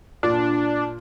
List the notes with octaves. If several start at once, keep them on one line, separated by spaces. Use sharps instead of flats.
A#2 D4